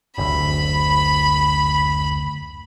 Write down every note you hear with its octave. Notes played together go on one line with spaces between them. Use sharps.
F#1 D2 B5